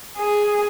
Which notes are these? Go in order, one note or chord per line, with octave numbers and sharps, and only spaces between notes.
G#4